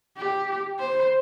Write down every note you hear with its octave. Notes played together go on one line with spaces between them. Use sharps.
G4
C5